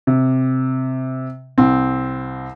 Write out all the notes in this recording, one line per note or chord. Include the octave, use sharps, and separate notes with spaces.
C3
C2 C4